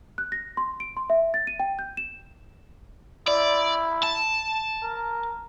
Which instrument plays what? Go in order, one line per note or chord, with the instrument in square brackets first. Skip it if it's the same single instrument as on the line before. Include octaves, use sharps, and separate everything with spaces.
[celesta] F#6
A#6
C6
D7
C6
E5
A6
D#7
G5
G6
E7
[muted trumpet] E4 [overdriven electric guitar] D5
[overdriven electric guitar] A5
[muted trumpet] A#4